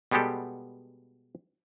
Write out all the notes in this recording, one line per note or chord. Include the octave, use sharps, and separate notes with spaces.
B2 G3 G#3 B3 G4 A4